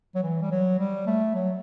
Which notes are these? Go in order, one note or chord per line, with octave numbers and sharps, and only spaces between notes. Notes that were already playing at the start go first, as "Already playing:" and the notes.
F#3
E3
G3
F#3
G3
A3
F#3